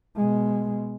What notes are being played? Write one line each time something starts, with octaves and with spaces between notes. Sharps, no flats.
B2 G#3